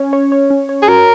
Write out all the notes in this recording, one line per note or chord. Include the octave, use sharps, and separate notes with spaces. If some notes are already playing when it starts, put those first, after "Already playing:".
Already playing: C#4 C#5
C#5
C#5
C#4
C#5
G#4
F#4 A#4